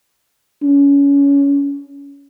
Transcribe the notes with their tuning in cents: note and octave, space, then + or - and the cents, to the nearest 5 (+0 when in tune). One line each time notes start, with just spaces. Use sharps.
C#4 +25